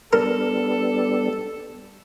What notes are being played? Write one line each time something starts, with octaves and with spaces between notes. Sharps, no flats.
G3 B3 D4 A4 A#4